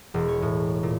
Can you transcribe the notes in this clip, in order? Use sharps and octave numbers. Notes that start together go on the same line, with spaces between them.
E1
C#5
A2
A#2